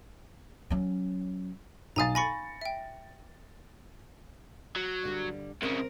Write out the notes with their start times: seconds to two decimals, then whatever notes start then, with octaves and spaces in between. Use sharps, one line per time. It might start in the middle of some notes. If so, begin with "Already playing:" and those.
0.70 F#3 C#4
1.96 B1 F5 G#5 A#5 D#6 A6
2.15 G#5 B5 C#6 A#6 C#7
2.61 E5 G5
4.76 F#3
5.03 G2 D3 G3
5.62 C2 C#3 C4 A#4